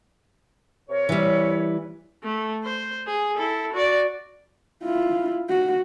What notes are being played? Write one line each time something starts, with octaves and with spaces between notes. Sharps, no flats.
C3 A#4 C#5
E3 G3
A3
C5
G#4
E4 A4
F#4 D5
E4 F4
F#4